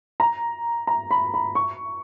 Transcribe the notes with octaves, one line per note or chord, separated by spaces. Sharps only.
A#5
A#5
B5
B5
C#6